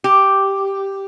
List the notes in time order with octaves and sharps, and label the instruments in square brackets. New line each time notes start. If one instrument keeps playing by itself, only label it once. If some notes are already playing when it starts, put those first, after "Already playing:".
[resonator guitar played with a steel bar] G4